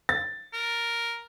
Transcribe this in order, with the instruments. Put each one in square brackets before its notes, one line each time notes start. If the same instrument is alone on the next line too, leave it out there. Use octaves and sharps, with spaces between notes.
[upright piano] A6
[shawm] A#4